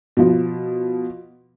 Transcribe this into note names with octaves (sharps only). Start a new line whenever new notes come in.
B2 F3